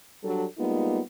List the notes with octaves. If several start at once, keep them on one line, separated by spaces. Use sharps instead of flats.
F#3 G3 D4 A4
G3 G#3 A#3 B3 D#4 F4